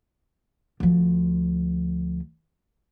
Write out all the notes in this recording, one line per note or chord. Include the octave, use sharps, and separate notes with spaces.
D2 F3